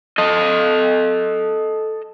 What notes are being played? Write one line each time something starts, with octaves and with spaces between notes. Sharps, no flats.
A4 D#5